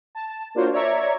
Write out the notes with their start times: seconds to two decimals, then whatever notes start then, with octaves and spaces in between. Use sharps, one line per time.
0.15 A5
0.55 A#3 D4 F4 F#4 C5 C#5
0.73 C#5 D5 E5 A#5 C#6 G#6